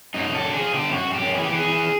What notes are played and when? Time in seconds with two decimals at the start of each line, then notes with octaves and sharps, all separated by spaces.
0.14 F#2 D#4
0.30 F#2 A4
0.45 D3
0.54 G#4
0.59 F3
0.74 D3 G4
0.89 F#2
0.94 F#4
1.04 F#2
1.14 G4
1.19 F#2
1.34 E3 G#4
1.44 G4
1.49 E3
1.54 G#4
1.64 E3